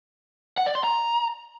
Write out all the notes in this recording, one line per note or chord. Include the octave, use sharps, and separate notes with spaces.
F#5
D5
C6
A#5